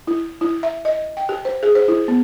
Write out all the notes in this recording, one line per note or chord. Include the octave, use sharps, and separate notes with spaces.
E4
E4
E5
D#5
G5
G4
C5
G#4
C5
E4
B3